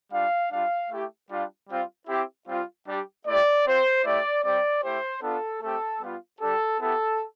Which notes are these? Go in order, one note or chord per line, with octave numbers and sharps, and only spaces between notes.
G3 D4 F4 F5
G3 D4 F4 F5
A3 E4 G4
G3 D4 F4
G3 C4 F4
C4 E4 G4
G3 C4 F4
G3 D4 G4
A3 E4 G4 D5
C4 F4 C5
A3 E4 G4 D5
G3 C4 G4 D5
A3 E4 G4 C5
B3 D4 F4 A4
A3 C4 G4 A4
G3 B3 F4
G3 D4 G4 A4
B3 E4 G4 A4